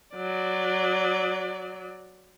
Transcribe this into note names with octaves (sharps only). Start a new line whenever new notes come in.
F#3 D5